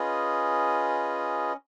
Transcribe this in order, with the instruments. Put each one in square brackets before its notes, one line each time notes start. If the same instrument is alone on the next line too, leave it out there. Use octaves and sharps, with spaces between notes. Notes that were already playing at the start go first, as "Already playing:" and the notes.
Already playing: [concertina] C#4 F4 G#4 B4 D#5